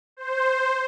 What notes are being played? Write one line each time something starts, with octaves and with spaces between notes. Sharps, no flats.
C5